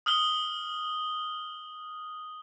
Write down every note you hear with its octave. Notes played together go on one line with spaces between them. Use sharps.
D#6 F6 F#7 G7